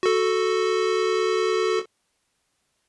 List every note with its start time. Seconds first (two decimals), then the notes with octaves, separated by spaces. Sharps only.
0.03 F#4 A4